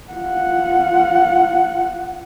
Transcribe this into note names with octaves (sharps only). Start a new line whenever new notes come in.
F4 F#5